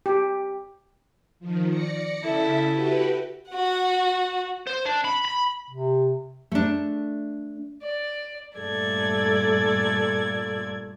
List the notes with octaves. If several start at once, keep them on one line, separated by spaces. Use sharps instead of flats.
G4
D#3 F3
D5 A#6 C#7
C#3 E4 A4 E5 B6
F#4 G4 B4
F#4 F#5
C5
D4
B5
B5
C3
A3 D4
D5
G2 A#2 A3 A4 D5 G#6